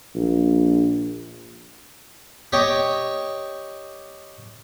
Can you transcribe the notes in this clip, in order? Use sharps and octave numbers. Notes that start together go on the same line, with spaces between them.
A#1
G4 C#5 D#5 G5